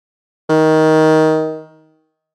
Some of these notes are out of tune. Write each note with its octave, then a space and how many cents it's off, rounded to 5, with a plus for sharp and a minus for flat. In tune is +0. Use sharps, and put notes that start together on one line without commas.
D#3 +15